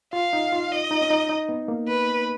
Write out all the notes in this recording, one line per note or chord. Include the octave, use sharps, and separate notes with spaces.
F4 F5
D#4
F4
D#5
D#4
C#4
D#4
D#4
B3
A#3
B4